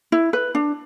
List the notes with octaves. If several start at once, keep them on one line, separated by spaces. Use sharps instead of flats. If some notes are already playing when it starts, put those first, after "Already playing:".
E4
B4
D4